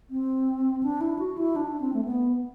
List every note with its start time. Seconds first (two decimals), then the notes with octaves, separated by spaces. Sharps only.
0.10 C4
0.83 D4
1.01 E4
1.19 F#4
1.38 E4
1.56 D4
1.81 C4
1.93 A3
2.05 B3